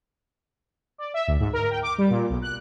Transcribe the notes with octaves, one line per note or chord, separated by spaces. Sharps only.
D5
E5
D2
G#2
A#4
G5
D6
G3
A#2
B1
F#6